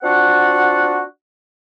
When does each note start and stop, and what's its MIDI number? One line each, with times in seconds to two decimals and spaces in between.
0.03 1.02 60
0.03 1.02 62
0.03 1.02 65
0.03 1.02 66
0.03 1.02 78